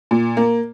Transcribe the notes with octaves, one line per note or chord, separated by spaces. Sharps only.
A#2
A#3